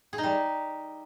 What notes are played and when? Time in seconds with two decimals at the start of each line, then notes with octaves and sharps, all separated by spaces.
0.13 G#4
0.18 D#4
0.23 G3